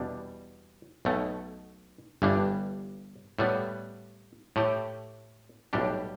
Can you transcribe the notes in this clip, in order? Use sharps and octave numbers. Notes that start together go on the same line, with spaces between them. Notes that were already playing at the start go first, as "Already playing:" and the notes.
Already playing: E2 B2 G3 D4
B1 B2 A3
G1 G2 E3 G3 D4
A2 G3 B3
A2 A3 G4
B1 A2 G3 D4 G4